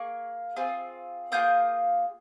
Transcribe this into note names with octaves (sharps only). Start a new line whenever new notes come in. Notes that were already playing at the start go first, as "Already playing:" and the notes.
Already playing: A#3 G#4 C#6
C4 F4 G#4
A#3 F4 G#4 D#6 G6